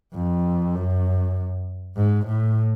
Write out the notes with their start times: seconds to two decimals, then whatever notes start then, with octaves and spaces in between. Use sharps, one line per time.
0.14 F2
0.74 F#2
1.97 G#2
2.27 A2